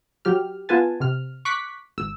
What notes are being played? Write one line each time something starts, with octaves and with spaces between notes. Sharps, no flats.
F#3 G4 F6
B3 F4 B4 G#5 A5
C3 F6
C#6 D6 F#6 B6
G#1 E6